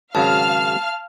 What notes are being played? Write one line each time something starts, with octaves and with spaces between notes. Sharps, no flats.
G#1 C#3 F#3 F5 A5 F6